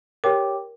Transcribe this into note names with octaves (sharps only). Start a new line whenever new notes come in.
G4 A#4 C#5 G5 D6